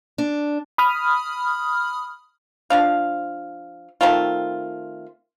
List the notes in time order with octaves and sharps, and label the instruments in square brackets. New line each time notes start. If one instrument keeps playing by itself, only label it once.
[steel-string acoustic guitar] D4
[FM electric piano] B5 D#6 F6
[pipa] F3 D4 F5
D#3 A3 C4 F4